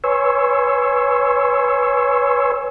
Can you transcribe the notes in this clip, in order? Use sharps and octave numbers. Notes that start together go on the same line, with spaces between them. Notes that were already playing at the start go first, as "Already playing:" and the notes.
B4 C#5 G#5 C6 C#6 E6